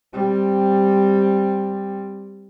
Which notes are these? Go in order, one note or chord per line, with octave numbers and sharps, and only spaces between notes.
G3 C4